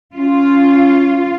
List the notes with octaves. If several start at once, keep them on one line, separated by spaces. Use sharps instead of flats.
C#4 F4